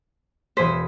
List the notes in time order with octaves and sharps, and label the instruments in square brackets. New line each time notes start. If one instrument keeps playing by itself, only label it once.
[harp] E1 G#4 B6 [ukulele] C5